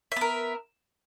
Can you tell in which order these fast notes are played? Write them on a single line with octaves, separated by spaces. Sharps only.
E5 B3 A#4